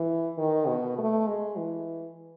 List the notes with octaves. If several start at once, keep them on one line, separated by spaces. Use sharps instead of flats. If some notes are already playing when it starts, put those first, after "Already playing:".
Already playing: E3
D#3
B2
A3
G#3
E3